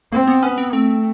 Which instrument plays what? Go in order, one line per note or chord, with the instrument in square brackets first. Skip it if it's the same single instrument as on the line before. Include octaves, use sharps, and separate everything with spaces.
[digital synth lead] A#3 [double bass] C4
[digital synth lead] B3
[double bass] B3 [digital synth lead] C#4
[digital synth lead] C4
[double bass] A3 [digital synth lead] C4